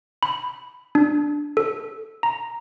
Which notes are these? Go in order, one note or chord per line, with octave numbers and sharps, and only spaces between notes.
B5
D4
A4
A#5